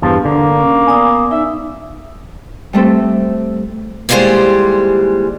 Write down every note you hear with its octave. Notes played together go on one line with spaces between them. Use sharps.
E2 G2 F3 A5
D3 A#3
C#4
B3 D5 G#5 D#6
D#4 E5
G3 A3 C4 A4
D#2 D3 E3 G3 G#3 C5